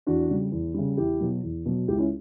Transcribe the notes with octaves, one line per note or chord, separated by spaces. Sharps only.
E2 D4 F#4
C#3 G3
E2
C#3 G3
E2 E4 G4
B2 F#3
E2
B2 F#3
C#2 E4 G4
C#4 E4